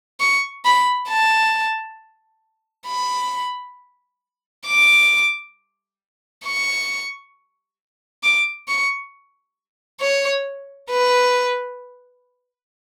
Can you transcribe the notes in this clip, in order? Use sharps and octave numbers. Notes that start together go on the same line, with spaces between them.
C#6
B5
A5
B5
D6
C#6
D6
C#6
C#5
B4